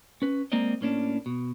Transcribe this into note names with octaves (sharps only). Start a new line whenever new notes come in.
C#4 B4
G#3 A#3 C4 A#4 D5 D#5
A2 A#3 C#4 D4
B2